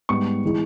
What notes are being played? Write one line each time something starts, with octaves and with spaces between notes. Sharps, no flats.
G#2 G3 B3 C#6
E3 G#3